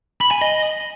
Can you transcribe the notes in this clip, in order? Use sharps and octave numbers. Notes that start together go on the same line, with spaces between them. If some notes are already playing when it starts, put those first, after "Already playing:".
B5
G#5
D#5